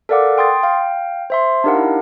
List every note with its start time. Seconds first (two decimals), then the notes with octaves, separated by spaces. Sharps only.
0.09 A4 A#4 D5 F5 F#5 D6
0.38 G5 C6 D#6 A6
0.63 F5 G5
1.30 C5 E5 C6
1.64 D4 D#4 G4 A#4 F5 F#5
1.76 E4